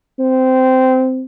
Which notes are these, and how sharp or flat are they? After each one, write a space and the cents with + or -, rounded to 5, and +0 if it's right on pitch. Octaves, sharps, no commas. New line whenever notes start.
C4 -15